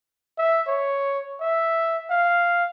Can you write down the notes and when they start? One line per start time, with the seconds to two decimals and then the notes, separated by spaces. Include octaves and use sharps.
0.38 E5
0.68 C#5
1.41 E5
2.10 F5